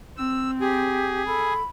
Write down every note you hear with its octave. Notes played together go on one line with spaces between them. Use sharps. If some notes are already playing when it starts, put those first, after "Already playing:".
C4 E6
G4 G#4
A4 B5